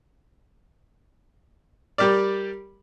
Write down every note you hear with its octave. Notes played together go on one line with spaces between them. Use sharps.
G3 G4 A#4 D5